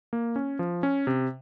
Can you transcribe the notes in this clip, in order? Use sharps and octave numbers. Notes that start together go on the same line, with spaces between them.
A#3
C#4
F3
C#4
C3